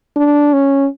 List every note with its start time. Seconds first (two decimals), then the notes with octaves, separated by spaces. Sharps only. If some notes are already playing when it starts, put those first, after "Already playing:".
0.16 D4
0.53 C#4